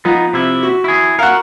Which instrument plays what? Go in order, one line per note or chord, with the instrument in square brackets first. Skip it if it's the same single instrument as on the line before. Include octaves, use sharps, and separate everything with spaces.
[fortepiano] F3 [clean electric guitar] B3 D#4
[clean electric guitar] C3 E4
[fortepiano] F#4
[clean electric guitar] E4 G#4
[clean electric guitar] F#4 A#4 [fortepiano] F5 F#5